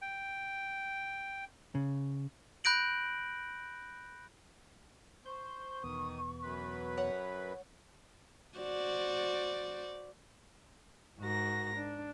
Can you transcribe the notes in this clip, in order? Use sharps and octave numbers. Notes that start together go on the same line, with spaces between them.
G5
C#3
B5 F#6 G6 A#6 D7 F#7
C5 C#6 G6
E2 B2 D#3 B3 D#6
F#2 B4
C#5 F#5
F#4 C5 D5
G#2 F#4 A#4 A#6
D4